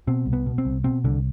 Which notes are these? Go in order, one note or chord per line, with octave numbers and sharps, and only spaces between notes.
B2 C4
C2
B3
B2
C4
C2
B2 C4
C2 D3